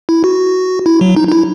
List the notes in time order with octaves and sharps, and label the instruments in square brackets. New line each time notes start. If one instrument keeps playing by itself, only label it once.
[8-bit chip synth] E4
F#4
E4
F#3
D#4
D#4
E4